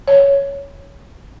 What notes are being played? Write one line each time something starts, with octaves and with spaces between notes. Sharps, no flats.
C#5